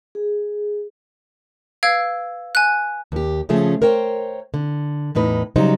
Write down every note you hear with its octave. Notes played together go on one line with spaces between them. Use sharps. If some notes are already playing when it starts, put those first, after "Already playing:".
G#4
B4 F5 E6 G#6 D7
G#5 F#6
D#2 G4
C#3 F3 A3 C#4 G#4
A#4 C5 C#5 G5
D3
E2 A2 D#4 B4
C#3 F#3 G3 D#4 C5